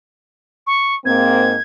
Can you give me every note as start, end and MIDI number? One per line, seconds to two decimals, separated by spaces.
0.67 0.95 85
1.05 1.54 44
1.05 1.54 58
1.05 1.54 60
1.05 1.62 92